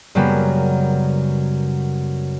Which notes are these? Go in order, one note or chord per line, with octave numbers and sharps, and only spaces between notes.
F#2 C#3 G3 A#3 B3